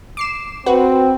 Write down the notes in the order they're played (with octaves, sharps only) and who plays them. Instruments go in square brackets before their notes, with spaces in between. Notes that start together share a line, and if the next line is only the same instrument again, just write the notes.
[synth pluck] D6 C7 E7
[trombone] C4 [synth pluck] F#4 B4